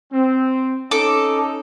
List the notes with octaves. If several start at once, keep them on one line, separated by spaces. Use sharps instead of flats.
C4
C#4 D#4 A4 D6